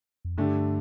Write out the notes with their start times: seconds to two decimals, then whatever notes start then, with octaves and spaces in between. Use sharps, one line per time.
0.25 F2
0.37 G2 D3 A3 D4 G4